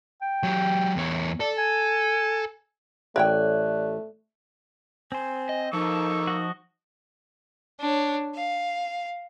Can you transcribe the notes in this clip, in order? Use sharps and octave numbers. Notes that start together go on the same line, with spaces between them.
G5
F#3 G4
E2 C#5
A4 D5
G#5
A1 A3 A#4 C#5 D5 E5 G5 F#6
C4 C5 G#5
D#5
F3 A#3 D#4 A4 C#6 E6
F#4 D#5
D4 C#5
F5